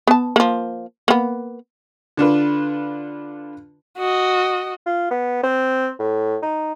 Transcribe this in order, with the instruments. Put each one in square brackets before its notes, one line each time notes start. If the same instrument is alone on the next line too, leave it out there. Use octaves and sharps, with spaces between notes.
[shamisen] B3 A5
F3 A#3
A#3 B3
[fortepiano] D3 D4 F4 B4
[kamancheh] F#4 D#5
[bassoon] F4
B3
C4
A2
D#4